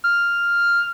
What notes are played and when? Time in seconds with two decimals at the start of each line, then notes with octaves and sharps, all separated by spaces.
0.04 F6